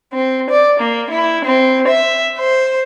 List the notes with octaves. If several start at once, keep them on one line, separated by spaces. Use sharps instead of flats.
C4
D5
A#3
E4
C4
E5
C5